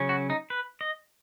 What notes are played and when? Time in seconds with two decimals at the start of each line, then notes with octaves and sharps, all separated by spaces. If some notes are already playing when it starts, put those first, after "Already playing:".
Already playing: C#3 F#3 C#4
0.09 F#4
0.30 D#4
0.50 B4
0.81 D#5